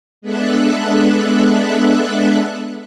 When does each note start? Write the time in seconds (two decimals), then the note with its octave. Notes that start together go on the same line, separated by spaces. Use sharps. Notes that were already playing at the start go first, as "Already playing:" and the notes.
0.22 G#3 B3 D4 A4 E5 F#6